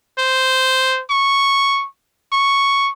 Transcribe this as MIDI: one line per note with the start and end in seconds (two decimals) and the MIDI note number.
0.18 1.01 72
1.10 1.86 85
2.32 2.91 85